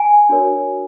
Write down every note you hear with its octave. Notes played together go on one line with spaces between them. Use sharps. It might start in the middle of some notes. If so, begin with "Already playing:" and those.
Already playing: G#5
D4 F#4 A#4 C#5